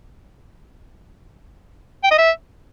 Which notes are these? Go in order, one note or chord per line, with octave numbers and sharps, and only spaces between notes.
G5
D#5
E5